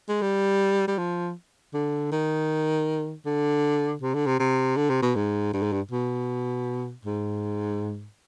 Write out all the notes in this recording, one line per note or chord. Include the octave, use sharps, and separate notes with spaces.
G#3
G3
G3
F3
D3
D#3
D3
C3
D3
C3
C3
D3
C3
B2
G#2
G2
G#2
G2
B2
G#2